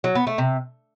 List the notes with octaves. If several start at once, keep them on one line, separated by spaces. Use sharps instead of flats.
F#3
B3
A3
C3